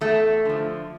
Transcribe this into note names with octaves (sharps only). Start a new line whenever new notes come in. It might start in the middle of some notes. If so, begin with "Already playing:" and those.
E2 A3
D3 F3